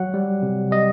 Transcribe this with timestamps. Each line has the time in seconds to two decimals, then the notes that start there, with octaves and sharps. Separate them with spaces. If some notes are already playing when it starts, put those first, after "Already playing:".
Already playing: F#3 F#5
0.14 G3
0.43 C3
0.71 G3 D#5